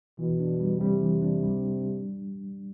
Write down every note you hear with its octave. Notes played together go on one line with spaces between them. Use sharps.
B2 E3
D4
G3
C3 G3
E3
D4
G3